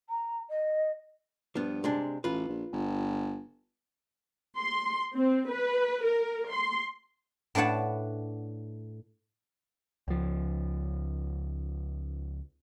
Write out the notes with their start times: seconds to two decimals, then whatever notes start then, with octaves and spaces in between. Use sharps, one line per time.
0.09 A#5
0.49 D#5
1.55 G2 F3 B3
1.84 C3 G#3 D4
2.24 A1 F4 B4
2.49 A#1
2.73 G1
4.59 C6
5.15 C4
5.50 B4
6.04 A#4
6.52 C6
7.55 A2 D4 B4 C#5 F#5 A5
10.08 C#2 F3